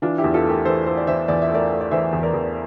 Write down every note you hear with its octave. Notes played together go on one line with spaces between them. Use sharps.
E3 D4 F4
E4 G4
E2
F4 A4
A3
G4 A#4
E3 A4 C5
A3 A4 C5
D5
E3 C5 E5
E2 D5
E5
A3
A#4 D5
A3
D5
E3 C5 E5
E2
A#4 D5
E2